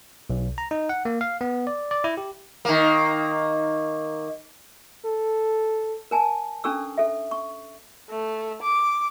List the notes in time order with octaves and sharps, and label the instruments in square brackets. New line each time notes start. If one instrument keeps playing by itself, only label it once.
[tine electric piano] B1
A#5
D#4
F#5
A#3
F5
B3
D5
D5
E4
G4
[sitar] D#3 A#3
[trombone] A4
[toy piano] A#4 G#5 A5
C#4 D4 A4 C#6 E6
A4 E5
C#6
[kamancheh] A3
D6